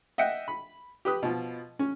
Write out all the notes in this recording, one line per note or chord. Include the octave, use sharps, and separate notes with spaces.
D#5 E5 F#5 G5
B5
G4 B4 D#6
B2 F3
C#4